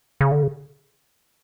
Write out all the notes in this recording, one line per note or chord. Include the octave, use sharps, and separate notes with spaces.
C#3
D3
C#3